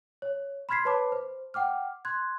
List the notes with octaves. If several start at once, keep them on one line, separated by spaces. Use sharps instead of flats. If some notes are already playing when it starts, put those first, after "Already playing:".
C#5
B5 C6 F6 G#6 B6 C7
B4 C#5 A5 B5 D6
C5
F#5 G5 D6 F6
C6 F#6 G#6